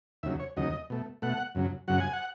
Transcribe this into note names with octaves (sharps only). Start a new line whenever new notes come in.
D#2 C#3 F#3 E5
C#5
D#2 C#3 F#3 D#5
B2 A3
B2 A3 F#5
F#2 C#3 F#3
F#2 C#3 F#3 F#5
G#5
F#5